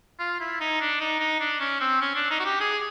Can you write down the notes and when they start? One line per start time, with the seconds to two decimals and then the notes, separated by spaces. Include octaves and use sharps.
0.19 F4
0.40 E4
0.60 D#4
0.81 D4
1.00 D#4
1.20 D#4
1.40 D4
1.60 C#4
1.80 C4
2.01 C#4
2.15 D4
2.30 D#4
2.39 F#4
2.45 G4
2.60 G#4